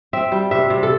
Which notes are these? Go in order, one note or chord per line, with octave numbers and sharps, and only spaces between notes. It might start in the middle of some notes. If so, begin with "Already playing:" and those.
C4 E5
G3
C3 E5
C3
A4